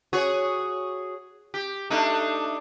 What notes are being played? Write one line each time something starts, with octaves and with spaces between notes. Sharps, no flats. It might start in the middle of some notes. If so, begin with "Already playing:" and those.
F#4 G#4 C#5
G4
A3 D4 D#4